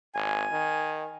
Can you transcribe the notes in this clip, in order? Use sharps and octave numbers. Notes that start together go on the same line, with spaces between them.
G#1 G#5
D#3